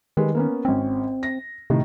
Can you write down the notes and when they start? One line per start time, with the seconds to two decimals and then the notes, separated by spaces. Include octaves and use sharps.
0.17 D#3 G3 G#3 B4
0.35 A#3 B3 C#4
0.65 G#1 C4 C#4
1.23 A#6
1.70 A2 C3 D#3